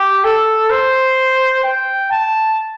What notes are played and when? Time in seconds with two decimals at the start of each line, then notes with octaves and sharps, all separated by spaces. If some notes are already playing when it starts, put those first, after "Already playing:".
Already playing: G4
0.24 A4
0.71 C5
1.64 G5
2.11 A5